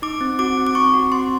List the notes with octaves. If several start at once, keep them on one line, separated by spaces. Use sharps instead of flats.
D#4 D6
C4
F#4 D6
C4
D6
C4 C#6
F#4
C4 C6